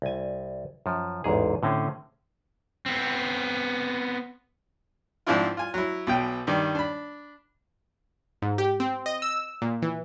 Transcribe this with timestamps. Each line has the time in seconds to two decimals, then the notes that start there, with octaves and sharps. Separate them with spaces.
0.02 C2 G#5
0.86 F#2 F3
1.24 A1 E2 G#2 G#4
1.63 A2 D3 C4 C#4
2.86 B3 C4
5.27 G#2 F3 C4 D4 E4 F4
5.57 F4 G#5
5.74 F#3 E4
6.07 B1 B2 G5
6.47 G2 D#3 D5
6.75 D4 B5
8.42 G#2
8.58 G4
8.80 C4
9.06 D#5
9.22 E6
9.62 A#2
9.82 E3